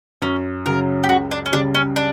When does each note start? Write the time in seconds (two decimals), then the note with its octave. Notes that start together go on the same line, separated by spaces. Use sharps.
0.22 F#2 C#4
0.66 C#3 F#3 A#4
1.04 G4
1.08 C#2 F#4
1.31 D4
1.46 C#4
1.52 C#3 G3 D4
1.74 C#4
1.96 D4